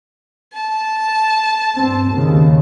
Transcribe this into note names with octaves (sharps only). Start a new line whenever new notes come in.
A5
G2 C4
D#2 C#3